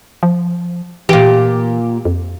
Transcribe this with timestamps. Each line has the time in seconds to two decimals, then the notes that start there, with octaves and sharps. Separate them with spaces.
0.23 F3
1.09 A#2 E3 G4
2.05 F2